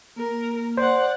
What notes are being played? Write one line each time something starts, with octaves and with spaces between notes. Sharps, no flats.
A#3 A#4
C5 D5 F#5